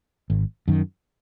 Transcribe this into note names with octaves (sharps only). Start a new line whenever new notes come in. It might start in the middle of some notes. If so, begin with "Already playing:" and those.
G#1
F#2 D#3